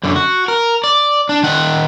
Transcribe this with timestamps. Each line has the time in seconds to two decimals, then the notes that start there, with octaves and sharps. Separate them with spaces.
0.04 F#2 D3
0.16 F#4
0.48 A#4
0.84 D5
1.29 D4
1.43 D#3 F#5